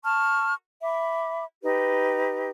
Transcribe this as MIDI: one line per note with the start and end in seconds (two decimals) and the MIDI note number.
0.04 0.53 81
0.04 0.53 85
0.04 0.53 89
0.83 1.44 76
0.83 1.44 83
0.83 1.44 86
1.63 2.50 63
1.63 2.50 67
1.63 2.50 71